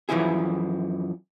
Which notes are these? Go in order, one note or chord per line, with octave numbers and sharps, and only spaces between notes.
F#2 E3 F3 E4 G#4